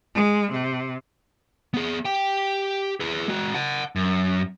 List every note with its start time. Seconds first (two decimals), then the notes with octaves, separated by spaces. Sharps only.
0.15 G#3
0.52 C3
1.74 B3 G#4
2.05 G4 G5
3.00 G#4 B4
3.28 G#3 F#4
3.54 F#5 A5
3.96 F#2